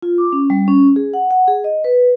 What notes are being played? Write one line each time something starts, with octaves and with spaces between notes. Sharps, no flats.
F4
D6
C#4
G3
C#4
G#4
F#5
F#5
G#4
D#5
B4